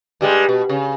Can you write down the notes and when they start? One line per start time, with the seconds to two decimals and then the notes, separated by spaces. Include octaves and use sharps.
0.21 G2 G3 G#3
0.49 B2
0.69 C#3